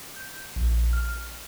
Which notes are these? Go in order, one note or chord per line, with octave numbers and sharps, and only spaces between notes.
G6
A#1
F6